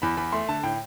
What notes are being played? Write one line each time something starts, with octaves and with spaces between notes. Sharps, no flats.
E2 B5
E2 B5
A3 C6
D3 A5
A2 G5